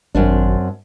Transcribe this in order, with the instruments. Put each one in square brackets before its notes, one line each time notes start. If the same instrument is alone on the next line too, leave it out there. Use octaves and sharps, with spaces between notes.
[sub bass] G#1 [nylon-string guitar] F#2 C4 D4